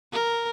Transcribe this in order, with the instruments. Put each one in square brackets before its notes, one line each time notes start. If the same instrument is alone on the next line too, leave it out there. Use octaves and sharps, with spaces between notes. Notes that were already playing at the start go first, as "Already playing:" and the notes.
[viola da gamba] A#4